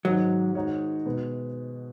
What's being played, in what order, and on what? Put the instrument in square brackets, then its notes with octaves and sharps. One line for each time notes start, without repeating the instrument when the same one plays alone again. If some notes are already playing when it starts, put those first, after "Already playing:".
[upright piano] G#2 D#3 G#3 [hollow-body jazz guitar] F#3
[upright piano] D#3 G#3 D#4 F#4 C#5
B2 G#3 B3